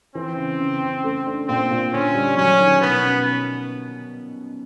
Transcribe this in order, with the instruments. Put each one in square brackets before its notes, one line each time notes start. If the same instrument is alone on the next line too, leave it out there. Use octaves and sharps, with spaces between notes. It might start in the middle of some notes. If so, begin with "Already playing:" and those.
[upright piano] E3 [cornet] C4
[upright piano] C#3
C#3
C#3
A3
D4
[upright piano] A#2 [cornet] C4
[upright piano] A#2
[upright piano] D3 [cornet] C#4
[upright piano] G3
[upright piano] F#3 [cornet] C#4
[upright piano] D#3
[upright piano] B2 [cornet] B3
[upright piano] C#4